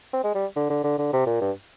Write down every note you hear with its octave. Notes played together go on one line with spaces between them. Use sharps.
C4
G#3
G3
D3
D3
D3
D3
C3
A#2
G2